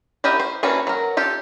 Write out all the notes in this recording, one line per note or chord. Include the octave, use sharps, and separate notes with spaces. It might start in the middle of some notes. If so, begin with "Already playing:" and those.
E4 F#4 G4 A#4 D#5
C5
E3 A#3 C#4 D4 F#4
F#3 A#4
F4 G4 A4